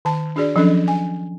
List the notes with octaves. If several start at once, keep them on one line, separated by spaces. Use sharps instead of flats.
D#3 A5
D4 F#4 G#4 D5
F3 F#3 C#4 D4 A4 D#5
G#5